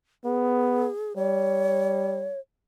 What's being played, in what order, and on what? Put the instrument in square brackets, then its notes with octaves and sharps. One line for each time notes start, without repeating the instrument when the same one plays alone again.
[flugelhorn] B3 [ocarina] G#4
[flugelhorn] G3 [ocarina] C#5